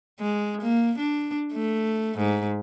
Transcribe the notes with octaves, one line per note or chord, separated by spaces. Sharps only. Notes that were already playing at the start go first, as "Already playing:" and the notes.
G#3
A#3
D4
A3
G#2